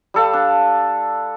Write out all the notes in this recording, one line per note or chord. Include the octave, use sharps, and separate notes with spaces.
G3 A4 F5
D4